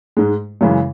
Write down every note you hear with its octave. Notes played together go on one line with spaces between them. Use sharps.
G#2 G#3
F#2 C#3 E3 G#3